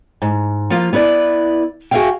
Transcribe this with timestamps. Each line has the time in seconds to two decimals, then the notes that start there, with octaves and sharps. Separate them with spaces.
0.22 G#2
0.70 F3 A#3 F4
0.93 B3 E4 B4 D5
1.91 F#4 G#4 A#4 E5 F5 G5